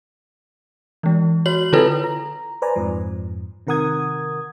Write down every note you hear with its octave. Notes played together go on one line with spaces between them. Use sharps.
E3 G#3
F#4 C#5 F#7
D3 E4 F4 A4 B4
A#5
B4 C5 D5 G#5 A#5
F2 G#2 F3
C3 D#3 A#4 F#5 D#6 G#6